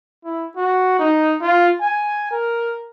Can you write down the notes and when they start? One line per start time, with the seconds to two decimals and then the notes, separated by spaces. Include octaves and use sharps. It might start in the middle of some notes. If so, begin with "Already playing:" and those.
0.24 E4
0.56 F#4
0.99 D#4
1.41 F4
1.81 G#5
2.31 A#4